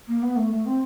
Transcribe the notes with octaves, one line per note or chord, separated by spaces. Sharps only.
A#3
B3
A3
A3
C4